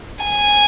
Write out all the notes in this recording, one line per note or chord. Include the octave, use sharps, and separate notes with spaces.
G#5